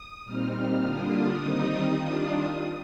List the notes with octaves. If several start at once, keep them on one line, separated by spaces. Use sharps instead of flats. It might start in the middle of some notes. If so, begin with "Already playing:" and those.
Already playing: D#6
A#2 G3 C4 D#4 F6
D3 G3 A#3 D4 F4 D#6
D#3 G3 C4 D#4
D#3 G3 D4 F4